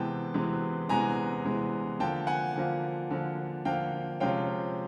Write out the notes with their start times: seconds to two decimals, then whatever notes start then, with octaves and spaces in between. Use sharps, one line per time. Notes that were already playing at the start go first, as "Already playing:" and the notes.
Already playing: C3 E3 G#3 B3 G5 A5
0.34 C3 E3 G#3 B3
0.89 C3 E3 G#3 B3 G#5 A#5
1.45 C3 E3 G#3 B3
2.00 D3 F3 A#3 G5 A5
2.27 F#5 G#5
2.56 D3 F3 A#3
3.11 D3 F3 A#3
3.65 D3 F3 A#3 F5 G5
4.20 C3 F3 G#3 C#4 F5 G5